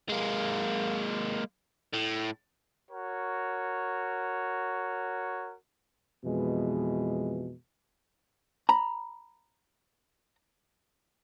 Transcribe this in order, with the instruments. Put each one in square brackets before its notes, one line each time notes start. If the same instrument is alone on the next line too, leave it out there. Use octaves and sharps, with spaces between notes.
[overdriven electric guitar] G#3 A#3
A2
[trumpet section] F#4 A#4 C#5
[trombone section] F2 B2 E3 G#3
[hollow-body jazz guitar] A#5 B5